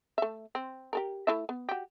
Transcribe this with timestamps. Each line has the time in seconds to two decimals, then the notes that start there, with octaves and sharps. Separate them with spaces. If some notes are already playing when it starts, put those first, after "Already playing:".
0.18 A3 E5
0.55 C4
0.93 G4 A4 A#4
1.27 A3 E4 E5
1.49 B3
1.69 F#4 G4